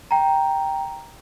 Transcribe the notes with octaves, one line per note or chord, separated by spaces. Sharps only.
G5 A#5